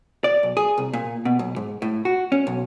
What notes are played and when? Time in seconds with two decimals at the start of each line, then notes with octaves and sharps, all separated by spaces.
0.24 D5
0.43 B1
0.57 G#4
0.78 C2
0.93 A#2
1.25 B2
1.39 B1
1.56 G#2
1.82 A2
2.05 F#4
2.32 C#4
2.47 B1